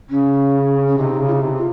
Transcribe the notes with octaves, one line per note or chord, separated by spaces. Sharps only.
C#3 C#4
C#4
C3 D#4
C#3
F4
D#4
C3
F4